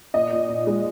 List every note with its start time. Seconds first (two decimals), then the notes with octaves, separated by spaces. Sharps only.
0.14 A#2 D#5
0.33 A#2
0.49 A#2
0.67 G#3